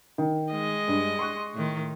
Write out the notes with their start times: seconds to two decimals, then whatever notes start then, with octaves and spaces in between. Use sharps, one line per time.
0.18 D#3
0.52 G#3 D#5
0.88 G2
1.19 C6 C#6 F#6
1.54 A2 D#3